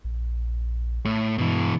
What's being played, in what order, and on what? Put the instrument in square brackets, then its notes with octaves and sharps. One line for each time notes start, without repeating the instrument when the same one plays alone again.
[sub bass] A#1
[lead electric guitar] A2
[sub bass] G2 [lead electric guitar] B2 E3